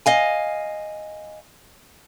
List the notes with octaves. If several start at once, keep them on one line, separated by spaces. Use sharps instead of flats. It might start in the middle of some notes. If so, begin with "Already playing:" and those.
D#5 F5 G#5